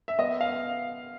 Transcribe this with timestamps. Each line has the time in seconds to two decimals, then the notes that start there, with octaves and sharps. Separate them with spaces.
0.08 E5
0.19 B3 D#5
0.41 F5